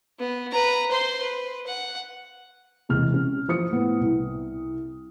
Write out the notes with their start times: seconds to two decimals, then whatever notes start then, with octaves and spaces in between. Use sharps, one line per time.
0.19 B3
0.52 B4 A#5
0.91 C5 C6
1.22 B4
1.67 F#5
2.89 E1 C3 G#3 F6
3.14 C#4
3.48 F3 C5 D#6 C#7
3.71 A2 B3
4.00 C2